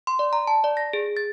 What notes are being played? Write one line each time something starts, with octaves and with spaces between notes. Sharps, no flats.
C6
D5
A#5
A5
D5
A#6
G#4
A6